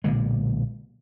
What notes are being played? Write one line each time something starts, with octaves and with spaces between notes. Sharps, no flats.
B1 A#2 D3 G#3